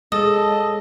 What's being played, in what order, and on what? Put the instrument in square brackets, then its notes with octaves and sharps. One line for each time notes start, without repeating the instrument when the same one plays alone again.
[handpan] G#3 [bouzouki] A4 [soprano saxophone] D#5 [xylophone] D#6